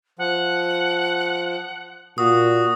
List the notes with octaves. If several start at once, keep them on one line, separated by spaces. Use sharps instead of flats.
F3 F#5
A#2 F#4 D#6